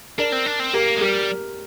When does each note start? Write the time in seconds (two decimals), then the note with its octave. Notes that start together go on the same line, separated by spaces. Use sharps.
0.18 D4 A#4 D5
0.32 C4
0.46 D4
0.60 C4
0.73 A#3 G4 A#4
0.97 G#3
1.01 G3 G4 A#4